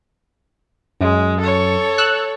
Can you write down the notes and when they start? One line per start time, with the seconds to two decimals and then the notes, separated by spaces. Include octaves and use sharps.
1.01 F#2 G#3
1.40 A4 C#5
1.98 E6 F#6